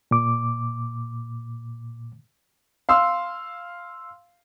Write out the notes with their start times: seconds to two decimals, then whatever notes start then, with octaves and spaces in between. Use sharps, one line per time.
0.11 A#2 D6
2.89 F5 C6 E6